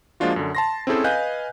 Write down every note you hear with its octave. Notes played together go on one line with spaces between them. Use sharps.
F3 G#3 A#3 D4 F4 F#4
F#2 D3
A5 C6 A#6
C4 C#4 E4 G#4 A4 C5
B4 D#5 F5 G#5 F#6 G6